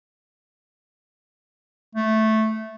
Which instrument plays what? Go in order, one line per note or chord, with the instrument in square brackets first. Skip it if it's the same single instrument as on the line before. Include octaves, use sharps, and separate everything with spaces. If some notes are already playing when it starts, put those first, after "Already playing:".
[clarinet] A3